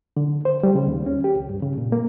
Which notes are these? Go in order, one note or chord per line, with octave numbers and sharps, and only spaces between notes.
D3
C5
G3
C#3
D#2
C#4
G4
C#2
G2
C#3
A#2
A#3